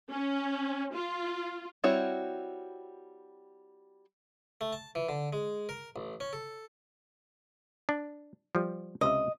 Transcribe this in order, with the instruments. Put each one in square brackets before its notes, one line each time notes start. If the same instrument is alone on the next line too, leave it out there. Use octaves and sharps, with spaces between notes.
[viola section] C#4
F4
[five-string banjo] G3 C4 E4 F#4 C#5
[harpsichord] A3
A5
E3
D3
G#3
A#4
A1
C#4
A4
[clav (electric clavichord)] D4
F3 G3
[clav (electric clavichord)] C#2 C3 E5 [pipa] D#5